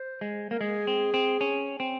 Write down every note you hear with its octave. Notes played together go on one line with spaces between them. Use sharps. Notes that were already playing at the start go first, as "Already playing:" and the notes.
Already playing: C5
G#3
A#3 A#4
G#3 G#4
C4
C4
C#4
C4